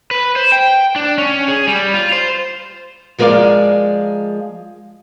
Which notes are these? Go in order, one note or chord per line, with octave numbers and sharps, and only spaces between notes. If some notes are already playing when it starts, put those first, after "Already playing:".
B4
C5
G5
D4
C#4
G#4
G3
F4
C5
F3 G#3 A#4 B4 D5 F5